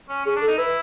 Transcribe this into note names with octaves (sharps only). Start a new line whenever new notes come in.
C#4
C#4 G#4
D4
A4
D#4
E4 B4